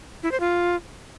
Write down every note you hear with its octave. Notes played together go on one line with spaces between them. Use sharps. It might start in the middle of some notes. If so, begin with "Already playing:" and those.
E4
C5
F4